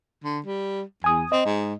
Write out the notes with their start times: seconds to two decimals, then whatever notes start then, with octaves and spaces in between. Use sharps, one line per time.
0.24 D3
0.45 G3
1.04 E2 G#5 D#6
1.32 C4 D#5
1.45 G#2